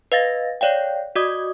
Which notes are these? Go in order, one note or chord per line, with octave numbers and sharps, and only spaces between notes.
B4 D#5 F5 A6 A#6
C#5 D5 F5 G5
F#4 D5 D#5 D6 D#6 G#6